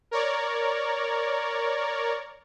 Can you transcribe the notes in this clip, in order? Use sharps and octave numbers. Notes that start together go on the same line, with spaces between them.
A#4 C#5 D5